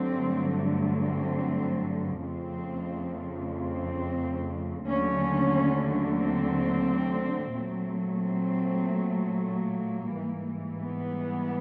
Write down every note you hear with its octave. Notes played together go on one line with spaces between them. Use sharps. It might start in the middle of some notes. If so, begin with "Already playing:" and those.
Already playing: G2 D3 F#3 A3 C4
C4
F2 C#3 F3 A3 C4
C4
D#2 D3 F#3 A3 C#4
C4
A#2 F#3 A3
C4
A#3
G#2 E3 G3
B3